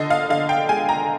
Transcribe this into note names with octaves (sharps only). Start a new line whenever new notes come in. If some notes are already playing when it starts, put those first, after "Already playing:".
Already playing: D3 F3 D#5
F5
D3 F5
G5
G#3 G#5
A#5